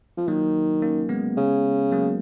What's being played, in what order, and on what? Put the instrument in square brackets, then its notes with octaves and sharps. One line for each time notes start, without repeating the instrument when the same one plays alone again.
[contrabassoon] F3
[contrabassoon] D#3 [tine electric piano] F#3 A#3
[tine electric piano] A#3 C#4
G#3 B3
[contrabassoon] C#3
[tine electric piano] F#3 A#3